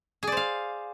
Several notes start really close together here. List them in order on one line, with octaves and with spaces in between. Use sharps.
G#4 D5 C5 F5